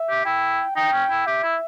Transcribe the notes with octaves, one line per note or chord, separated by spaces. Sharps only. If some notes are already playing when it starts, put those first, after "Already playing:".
Already playing: E5
G4
E4 G5
D#4 G5
C#4
E4
G4 E5
E4